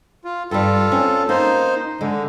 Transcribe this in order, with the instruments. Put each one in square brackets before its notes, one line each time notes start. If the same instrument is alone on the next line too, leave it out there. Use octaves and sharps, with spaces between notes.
[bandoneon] F4
[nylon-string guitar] G2 G3 [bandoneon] F4 A4
[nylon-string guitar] C4 C#4
[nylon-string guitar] A#3 [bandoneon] D#4 C5
[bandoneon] D3 [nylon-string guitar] G#3